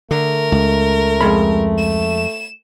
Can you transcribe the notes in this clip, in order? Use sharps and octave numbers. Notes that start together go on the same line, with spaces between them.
D3 A3 A#4
C#2
F2 G#3 B5
E7